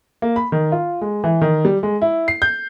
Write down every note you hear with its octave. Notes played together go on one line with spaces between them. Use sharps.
A#3
B5
D#3
F4
G#3
E3
D#3
G3
G#3
E4
C7
G6